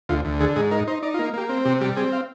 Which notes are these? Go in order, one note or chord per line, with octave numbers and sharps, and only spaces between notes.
D2 F4
D2
D3 G#4
G#2 G#4
D#4 A#4
D#4 C5
D#4 D5
F4
A#3
A#3 G4
C4
C3 G4
G3 G4
C4 G#4
F5